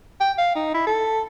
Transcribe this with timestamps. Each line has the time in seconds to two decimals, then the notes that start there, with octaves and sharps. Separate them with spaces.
0.21 G5
0.38 F5
0.56 D#4
0.74 E4
0.87 A4